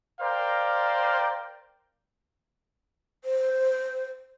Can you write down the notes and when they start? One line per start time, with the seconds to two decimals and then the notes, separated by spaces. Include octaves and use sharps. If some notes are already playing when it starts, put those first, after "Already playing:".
0.21 A#4 C5 D5 F5 G5
3.24 C5